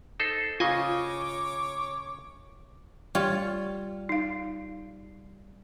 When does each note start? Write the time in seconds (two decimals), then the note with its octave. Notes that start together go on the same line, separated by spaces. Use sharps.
0.20 D#4 A4 C5
0.60 C#3 F4 C#5 D#5 G#5 D6
3.15 G3 F4 C#5
4.09 D#4 F5